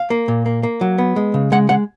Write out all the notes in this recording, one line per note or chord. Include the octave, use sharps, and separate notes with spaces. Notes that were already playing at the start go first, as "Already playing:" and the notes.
Already playing: F5
A#3
A#2
A#3
A#3
F#3
B3
G#3
C#3
G#3 F#5
G#3 F#5